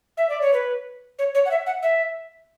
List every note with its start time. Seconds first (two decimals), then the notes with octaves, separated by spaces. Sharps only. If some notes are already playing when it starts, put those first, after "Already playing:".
0.17 E5
0.29 D5
0.41 C#5
0.53 B4
1.19 C#5
1.35 C#5
1.45 F#5
1.51 E5
1.66 F#5
1.82 E5